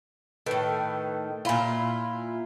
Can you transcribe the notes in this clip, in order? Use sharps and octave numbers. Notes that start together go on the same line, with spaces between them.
A2 D#3 A4 B4
A#2 E4 F4 B5